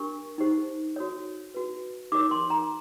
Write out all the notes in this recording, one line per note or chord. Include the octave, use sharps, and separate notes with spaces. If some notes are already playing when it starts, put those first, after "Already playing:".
Already playing: D4 G4 A#4 C#6
D#4 G4 C5
F#4 A4 C#5
F#4 B4
D#4 G4 A#4 C#5 D6
C6
A#5